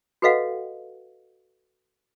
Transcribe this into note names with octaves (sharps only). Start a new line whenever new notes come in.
F#4 A4 B4 D#5 F5 F#5